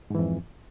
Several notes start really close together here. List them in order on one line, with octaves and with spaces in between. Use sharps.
G#2 E3 F2